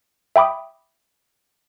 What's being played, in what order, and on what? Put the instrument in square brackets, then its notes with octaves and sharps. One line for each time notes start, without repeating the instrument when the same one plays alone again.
[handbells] E5 G5 B5 D6 D#6